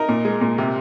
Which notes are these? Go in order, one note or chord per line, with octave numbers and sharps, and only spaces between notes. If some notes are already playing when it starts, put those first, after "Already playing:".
Already playing: D#4 A#4
A#2
G#3
A#2
C3